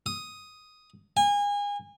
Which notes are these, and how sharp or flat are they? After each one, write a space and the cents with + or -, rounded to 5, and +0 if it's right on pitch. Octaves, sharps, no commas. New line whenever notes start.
D#6 +5
G#5 -30